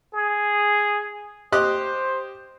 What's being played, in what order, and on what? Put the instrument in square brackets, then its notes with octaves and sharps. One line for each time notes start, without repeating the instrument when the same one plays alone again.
[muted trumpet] G#4
[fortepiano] G4 D#5 F#6 [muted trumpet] C5